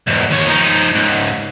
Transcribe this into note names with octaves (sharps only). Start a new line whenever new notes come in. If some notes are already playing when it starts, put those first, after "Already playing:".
E2 G#2
D#2 C#5
F3 D#4
C#2 G#2